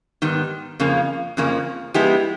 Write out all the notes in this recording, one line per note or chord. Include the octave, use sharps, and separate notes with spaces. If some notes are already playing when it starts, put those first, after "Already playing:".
G#2 D#3 G3 B3
F2 C#3 F3 A#3
F2 C#3 F3 A#3
F3 G#3 B3 E4 G4